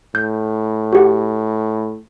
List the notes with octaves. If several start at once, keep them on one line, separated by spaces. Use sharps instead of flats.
A2 G6
F#4 G4 F#5